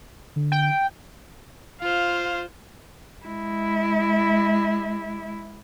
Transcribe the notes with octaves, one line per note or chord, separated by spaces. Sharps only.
D3
G5
F4 C5 F5
G#3 E4